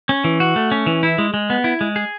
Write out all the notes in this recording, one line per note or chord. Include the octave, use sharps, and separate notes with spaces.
C#4
E3
F#4
A3
C#4
E3
E4
G#3
G#3
B3
E4
G#3
G#4